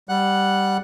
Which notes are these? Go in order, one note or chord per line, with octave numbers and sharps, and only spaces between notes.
G3 F#5 F#6